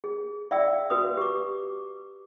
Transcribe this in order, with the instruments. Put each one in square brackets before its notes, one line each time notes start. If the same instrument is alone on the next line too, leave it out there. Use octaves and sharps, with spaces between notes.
[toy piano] G#4
D5 E5 F5 G5 E6
F#4 B4 D#6
G4 D6